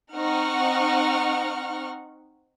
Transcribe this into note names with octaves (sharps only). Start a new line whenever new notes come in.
C4 D#4 F#5 C#6 F6